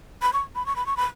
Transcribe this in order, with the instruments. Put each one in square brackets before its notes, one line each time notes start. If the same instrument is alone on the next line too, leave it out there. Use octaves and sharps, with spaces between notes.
[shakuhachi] B5
C#6
B5
C#6
B5
C#6
B5